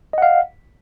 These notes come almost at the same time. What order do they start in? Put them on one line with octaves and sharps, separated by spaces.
D#5 F#5 F5